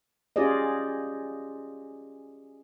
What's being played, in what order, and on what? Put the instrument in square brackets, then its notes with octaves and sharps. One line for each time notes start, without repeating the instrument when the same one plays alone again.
[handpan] C#4 F4 G4 G#4 D5 D#5